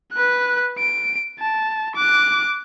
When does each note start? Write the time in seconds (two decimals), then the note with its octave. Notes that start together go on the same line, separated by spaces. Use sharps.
0.13 B4 F#6
0.79 D7
1.39 A5
1.95 D6 F#6